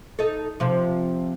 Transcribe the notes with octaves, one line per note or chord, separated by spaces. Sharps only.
D#4 A4
C3 F3